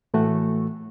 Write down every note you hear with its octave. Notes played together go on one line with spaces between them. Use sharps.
A2 E3 A3 F#4